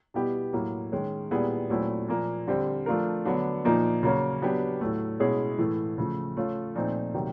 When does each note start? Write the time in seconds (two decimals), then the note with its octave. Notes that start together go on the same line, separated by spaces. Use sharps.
0.14 B2 G3 B3 E4 G4
0.53 A2 F#3 A#3
0.92 D#3 G#3 C#4
1.31 A#2 G3 B3 E4 G#4
1.70 A#2 F#3 A3 C4 E4
2.08 A#2 F3 A#3
2.47 D3 G3 C4
2.86 F3 A3 D4 F4 A#4
3.25 D3 F#3 B3 D4
3.65 A#2 F3 A#3 D#4
4.03 C#3 F#3 A#3 C#4
4.42 F#3 B3 D4 G4
4.81 A2 F#3 A3
5.20 B2 G#3 C#4 E4 G#4
5.58 A2 E3 A3
5.98 C#3 F3 A3
6.37 A3 C#4 F4
6.75 A#2 F3 A3 C4 D#4
7.14 C3 D#3 F#3 A#3